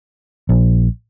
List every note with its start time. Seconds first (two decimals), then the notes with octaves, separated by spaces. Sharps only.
0.49 A#1